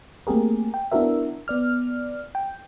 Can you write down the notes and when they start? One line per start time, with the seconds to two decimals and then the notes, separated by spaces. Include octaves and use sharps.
0.27 A3 A#3 C4 G4 G#4 A#4
0.74 G5
0.91 B3 D4 E4 F#4 A#4 E5
1.48 B3 D5 F6
2.35 G5